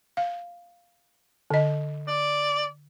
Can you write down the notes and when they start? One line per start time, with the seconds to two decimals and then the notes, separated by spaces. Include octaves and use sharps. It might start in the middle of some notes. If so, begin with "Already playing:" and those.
0.17 F5
1.51 D3 D#5
2.08 D5